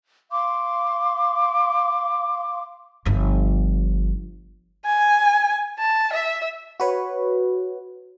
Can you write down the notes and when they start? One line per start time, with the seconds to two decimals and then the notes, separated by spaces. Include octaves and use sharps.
0.32 F5 C6 D6
3.05 G1 F3
4.85 G#5
5.79 A5
6.13 E5
6.80 F#4 B4 C#5